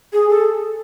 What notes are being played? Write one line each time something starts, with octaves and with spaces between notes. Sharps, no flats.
G#4
A4